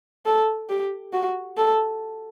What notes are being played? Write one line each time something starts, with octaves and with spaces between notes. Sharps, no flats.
A4
G4
F#4
A4